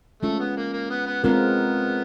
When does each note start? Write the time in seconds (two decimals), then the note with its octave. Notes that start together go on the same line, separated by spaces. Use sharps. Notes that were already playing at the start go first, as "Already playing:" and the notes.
0.23 G#3 A3 C#4 F4
0.40 B3
0.57 A#3
0.73 A#3
0.90 B3
1.07 B3
1.24 D3 G#3 B3 C4 F4 A#4